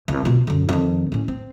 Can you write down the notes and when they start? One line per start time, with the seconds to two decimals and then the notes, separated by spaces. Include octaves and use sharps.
0.08 C2
0.25 B2 F4
0.47 F#2 D3
0.69 F2 D#3
1.12 A2 C#4
1.28 C4